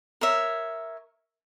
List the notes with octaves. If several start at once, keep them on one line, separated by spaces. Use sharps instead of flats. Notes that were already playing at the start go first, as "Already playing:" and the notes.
A#4 C#5 E5